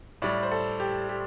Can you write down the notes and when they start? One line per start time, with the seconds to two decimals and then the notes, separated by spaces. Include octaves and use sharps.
0.22 A2 G3 D5
0.43 C5
0.51 A4
0.80 G4
1.09 G4